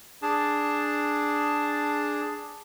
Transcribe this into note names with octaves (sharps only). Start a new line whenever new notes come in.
D4 G#4 A5